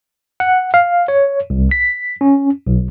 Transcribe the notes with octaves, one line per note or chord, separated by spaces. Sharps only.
F#5
F5
C#5
C2
B6
C#4
B1